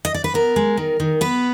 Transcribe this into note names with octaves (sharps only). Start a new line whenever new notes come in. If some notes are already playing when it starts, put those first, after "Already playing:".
D#5
D5
B4
B3 A#4
G#3
D#3
D#3
B3 B4